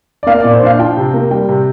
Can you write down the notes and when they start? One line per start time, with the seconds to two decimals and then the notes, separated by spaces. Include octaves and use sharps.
0.23 D5
0.27 A#3 F5
0.40 A#2 D5
0.54 C5
0.62 D4 F5
0.79 F3 G5
0.97 C3
1.14 A#3
1.31 G3 G5
1.49 C3